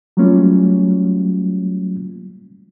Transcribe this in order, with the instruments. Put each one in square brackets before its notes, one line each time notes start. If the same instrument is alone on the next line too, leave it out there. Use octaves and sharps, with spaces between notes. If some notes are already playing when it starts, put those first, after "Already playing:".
[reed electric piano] F#3 G3 A3 A#3 C#4 F4